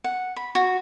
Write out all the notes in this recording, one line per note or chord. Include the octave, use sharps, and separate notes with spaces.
F#5
B5
F#4